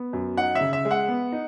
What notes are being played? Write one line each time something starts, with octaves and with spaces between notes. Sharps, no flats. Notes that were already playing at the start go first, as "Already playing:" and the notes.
Already playing: B3
F#2
D#4 F#5
E5
C#3
E5
G#3
F#5
B3
D#4